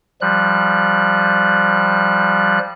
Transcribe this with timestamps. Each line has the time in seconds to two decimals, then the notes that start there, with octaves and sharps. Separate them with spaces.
0.21 F3 G3 F#6